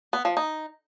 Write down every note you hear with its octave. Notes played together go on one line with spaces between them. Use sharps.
B3
F3
D#4